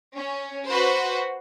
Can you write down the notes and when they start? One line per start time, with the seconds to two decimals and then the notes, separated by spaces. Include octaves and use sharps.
0.17 C#4
0.69 F#4 B4 C5